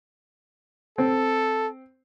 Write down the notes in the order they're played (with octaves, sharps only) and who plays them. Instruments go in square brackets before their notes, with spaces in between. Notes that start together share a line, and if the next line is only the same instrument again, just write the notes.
[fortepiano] C4 [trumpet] A4